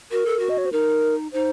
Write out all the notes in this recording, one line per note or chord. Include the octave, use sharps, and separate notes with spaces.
F#4 A#4
A4
F#4
D#5
C#5
C5
D#4 A#4
D#4 C5